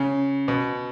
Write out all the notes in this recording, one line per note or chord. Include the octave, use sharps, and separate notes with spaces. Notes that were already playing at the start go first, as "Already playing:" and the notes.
Already playing: C#3
B2